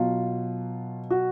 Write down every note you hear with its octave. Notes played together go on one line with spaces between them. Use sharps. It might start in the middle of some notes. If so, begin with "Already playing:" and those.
Already playing: B2 F#3 F4
F#4